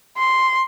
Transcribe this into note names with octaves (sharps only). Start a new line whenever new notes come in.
C6